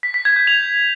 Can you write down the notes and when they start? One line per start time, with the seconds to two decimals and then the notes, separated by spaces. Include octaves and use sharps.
0.03 B6
0.14 B6
0.25 G#6
0.36 G6
0.47 F7